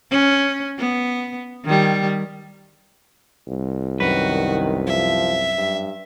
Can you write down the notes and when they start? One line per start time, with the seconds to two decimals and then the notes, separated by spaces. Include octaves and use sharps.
0.11 C#4
0.79 B3
1.65 D#3 G3
3.47 C2
4.00 F#2 D#3 F#4 B4
4.86 F3 E5
5.57 G2